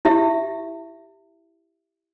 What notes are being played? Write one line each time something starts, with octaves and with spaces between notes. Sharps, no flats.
E4 G4 E5